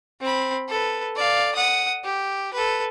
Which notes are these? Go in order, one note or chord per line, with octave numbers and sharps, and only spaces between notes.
C4 B5
A4 B4
D5 F5
F#5 D#6
G4
A4 B4